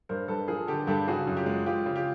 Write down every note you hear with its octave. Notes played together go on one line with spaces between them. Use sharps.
G2 A#4 C5
G2 A4 B4
F3 G#4 A#4
D3 G4 A4
G2 G4 A4
C#3 F#4 G#4
F#2
F4 G4
G#3
F3 F4 G4
C#3
F4 G4